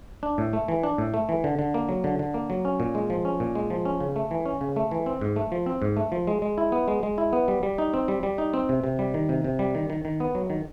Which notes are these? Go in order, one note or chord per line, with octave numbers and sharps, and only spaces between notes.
D4
A2
A3
E3
D4
A2
A3
E3
D3
D3
A#3
F#3
D3
D3
A#3
F#3
C#4
A#2
G#3
F3
C#4
A#2
G#3
F3
C#4
C#3
A3
E3
C#4
C#3
A3
E3
C4
G#2
A3
F3
C4
G#2
A3
F3
G#3
G#3
E4
B3
G#3
G#3
E4
B3
G3
G3
D#4
C4
G3
G3
D#4
C4
C3
C3
G3
D#3
C3
C3
G3
D#3
D#3
D#3
B3
F#3
D#3